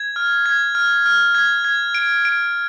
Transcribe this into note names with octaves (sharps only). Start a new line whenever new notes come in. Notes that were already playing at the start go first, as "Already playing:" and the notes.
Already playing: G#6
F6
G#6
F6
F6
G#6
G#6
D7
D7